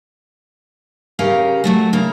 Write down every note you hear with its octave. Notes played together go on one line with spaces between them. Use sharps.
C#3 C#4 G4 A#4 F5
F#3 A3 F#4
C#3 A#3 A#4